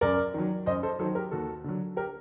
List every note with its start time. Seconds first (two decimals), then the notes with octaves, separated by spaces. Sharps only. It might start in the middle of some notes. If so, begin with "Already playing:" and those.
0.01 F#2 A#4 D5
0.34 D#3 F#3
0.66 F#2 C5 D#5
0.83 A4 C5
0.99 D#3 F#3 A4 C5
1.15 G4 A#4
1.31 D#2 F#4 A4
1.64 D3 F#3
1.96 G4 A#4